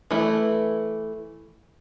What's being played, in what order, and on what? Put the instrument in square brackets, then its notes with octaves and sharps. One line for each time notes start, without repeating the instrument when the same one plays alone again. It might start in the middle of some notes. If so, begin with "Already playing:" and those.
[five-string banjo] E3 A3 E4